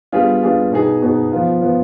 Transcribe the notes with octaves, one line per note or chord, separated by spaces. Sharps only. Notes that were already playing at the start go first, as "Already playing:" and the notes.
G3 B3 D4 F4 G#4
G3 B3 D4 F4 G#4
B2 B3 D#4 G#4
B2 B3 D#4 G#4
F3 B3 F4
F3 B3 F4